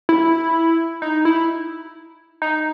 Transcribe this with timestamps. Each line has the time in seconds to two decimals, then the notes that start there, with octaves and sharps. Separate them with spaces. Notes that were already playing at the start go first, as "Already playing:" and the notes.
0.09 E4
1.02 D#4
1.25 E4
2.42 D#4